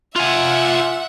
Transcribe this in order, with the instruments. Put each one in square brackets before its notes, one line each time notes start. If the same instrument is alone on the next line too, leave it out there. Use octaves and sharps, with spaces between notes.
[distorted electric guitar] F4 G#5 [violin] E5 F#5